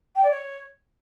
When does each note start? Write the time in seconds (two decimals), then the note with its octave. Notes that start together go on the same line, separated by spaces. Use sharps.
0.15 G5
0.23 D5
0.30 C#5